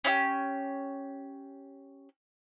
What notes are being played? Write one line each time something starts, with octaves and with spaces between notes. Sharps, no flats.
C#4 E4 G4